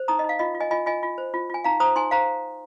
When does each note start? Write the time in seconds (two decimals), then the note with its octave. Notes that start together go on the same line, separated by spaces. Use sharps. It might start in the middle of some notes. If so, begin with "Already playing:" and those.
Already playing: C5
0.08 D#4 A#5 D#6
0.19 D#4 D#5
0.29 F5
0.39 F4 D#5
0.55 F4
0.61 D#5 G#5
0.71 F4 D#5 G#5
0.86 F4 D#5 G#5
1.03 F4
1.18 C5
1.34 F4
1.50 F4 G#5
1.64 D#4 F5 A#5
1.80 C5 A#5 D#6
1.96 D#4 G#5 C6
2.11 C5 F5 A#5